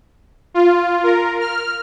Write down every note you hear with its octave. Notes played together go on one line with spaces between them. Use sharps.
F4
A#4
F6